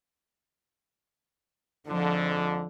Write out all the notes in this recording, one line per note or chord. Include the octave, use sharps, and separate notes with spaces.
F2 G#2 D3 F3